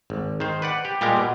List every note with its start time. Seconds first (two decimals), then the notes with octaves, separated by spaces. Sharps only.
0.10 G#1
0.40 D#3 C5
0.62 B4 D5 F#5
0.85 G4
1.01 A#2 G3 G#3 G4 A#4
1.16 B2